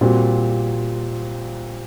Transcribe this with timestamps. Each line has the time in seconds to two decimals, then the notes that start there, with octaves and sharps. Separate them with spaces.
0.01 A#2 G3 C4 F#4